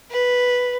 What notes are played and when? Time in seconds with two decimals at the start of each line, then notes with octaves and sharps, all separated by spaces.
0.10 B4